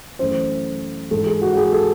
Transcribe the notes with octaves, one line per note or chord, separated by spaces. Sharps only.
F#2 E3 A3 C5
G#2 E3 G#3 A4
G#4
F#4
F#4
G#4
A4